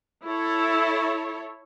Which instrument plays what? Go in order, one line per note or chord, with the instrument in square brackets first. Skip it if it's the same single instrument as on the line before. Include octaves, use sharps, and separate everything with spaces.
[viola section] E4 A4 C#5